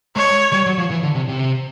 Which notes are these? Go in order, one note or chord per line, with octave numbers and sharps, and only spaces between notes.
G#3 C#5
G3
F#3
F3
E3
D3
C3
C3